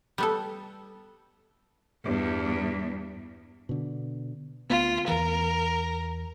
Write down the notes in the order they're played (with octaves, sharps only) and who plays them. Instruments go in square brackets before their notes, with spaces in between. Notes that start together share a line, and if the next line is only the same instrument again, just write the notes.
[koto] G3 B3 A4
[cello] E2 G2
[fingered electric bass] B2 D3
[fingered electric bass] D2 A3 B3 [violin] F4
[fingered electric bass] E2 E3 [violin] A#4